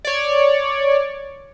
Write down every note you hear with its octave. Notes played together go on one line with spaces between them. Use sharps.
C#5 D5